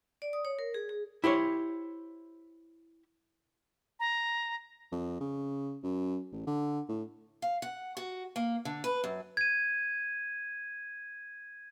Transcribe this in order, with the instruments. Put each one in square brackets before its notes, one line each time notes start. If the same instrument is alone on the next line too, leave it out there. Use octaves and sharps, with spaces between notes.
[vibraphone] D5
D#6
C#5
A#4
G#4
G#4
[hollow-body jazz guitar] E4 G4 C5 C#5
[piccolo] A#5
[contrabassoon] F2
C#3
F#2
A1
D3
A2
[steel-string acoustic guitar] F5
F#5
F#4
A#3
D3
B4
F#2
[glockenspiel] G#6 D#7